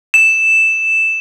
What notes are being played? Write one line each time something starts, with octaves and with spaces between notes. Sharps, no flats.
E7